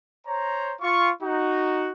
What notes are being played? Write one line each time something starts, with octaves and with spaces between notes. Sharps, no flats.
C5 C#5 A#5
F4 C#6
D#4 F#4